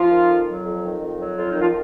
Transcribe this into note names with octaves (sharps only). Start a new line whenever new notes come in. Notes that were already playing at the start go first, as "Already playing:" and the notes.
Already playing: F3 F4
D#3
F2
F#3
F2
D#3
F2
F#3
F2 F4
D#4
D#3 F3 F4